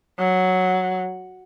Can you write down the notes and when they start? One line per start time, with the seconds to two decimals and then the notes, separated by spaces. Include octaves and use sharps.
0.19 F#3